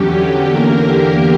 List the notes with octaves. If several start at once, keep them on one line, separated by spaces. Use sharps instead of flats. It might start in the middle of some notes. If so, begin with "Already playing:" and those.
Already playing: E2 D3 F#3 C#4 G4
E2 D3 A#3 A#4
G4